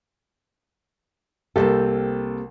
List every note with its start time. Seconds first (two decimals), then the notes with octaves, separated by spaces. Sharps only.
1.56 C2 A#3 C4 G4 A4